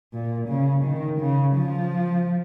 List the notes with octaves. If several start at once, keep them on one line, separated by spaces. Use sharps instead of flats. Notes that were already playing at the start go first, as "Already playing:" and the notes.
A#2
C#3
D#3
C#3
F3